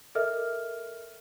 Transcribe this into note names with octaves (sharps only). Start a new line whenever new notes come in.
A4 A#4 D#5 E5 F6